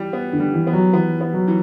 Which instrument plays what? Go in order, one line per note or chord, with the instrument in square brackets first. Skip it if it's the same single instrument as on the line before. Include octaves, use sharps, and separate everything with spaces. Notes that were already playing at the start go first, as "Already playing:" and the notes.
Already playing: [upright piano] E3 G3
B3
[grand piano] D3
[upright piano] G3
[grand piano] E3
[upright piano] B3
[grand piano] F#3
[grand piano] E3 [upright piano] B3
[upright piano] B3
[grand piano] F#3
[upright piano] E3